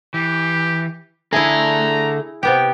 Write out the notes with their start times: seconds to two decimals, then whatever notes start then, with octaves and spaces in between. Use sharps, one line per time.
0.14 E3 G4
1.33 D3 E4 G#4 A4 E5 A#5
2.43 C3 B3 G4 G5